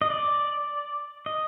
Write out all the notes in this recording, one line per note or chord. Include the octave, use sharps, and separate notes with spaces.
D#5
D5
D#5